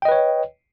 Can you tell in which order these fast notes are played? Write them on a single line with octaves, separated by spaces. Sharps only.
G5 D#5 B4 C#5